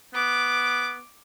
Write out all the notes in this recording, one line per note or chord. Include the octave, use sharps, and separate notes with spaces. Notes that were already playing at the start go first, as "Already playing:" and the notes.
B3 D6